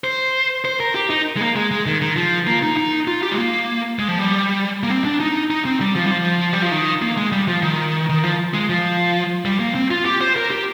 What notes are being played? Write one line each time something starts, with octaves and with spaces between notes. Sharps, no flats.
C5
C5
A#4
G4
D#4
G#3
A#3
G#3
G#3
D#3
D#3
F3
A#3
D#4
D#4
F4
G4
G#3
A#3
G#3
F3
G3
A#3
C4
D4
D#4
D#4
C4
G3
F3
G3
F3
G3
F3
D#3
A#3
G#3
G3
F3
D#3
D#3
F3
G#3
F3
G3
A#3
C4
F4
G4
C5
A#4
G4